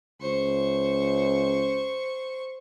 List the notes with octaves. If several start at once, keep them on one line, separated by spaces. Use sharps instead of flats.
C#2 C5 C#6